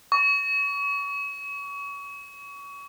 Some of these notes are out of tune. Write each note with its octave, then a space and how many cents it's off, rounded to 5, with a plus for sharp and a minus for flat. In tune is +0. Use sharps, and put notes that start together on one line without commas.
C#6 +30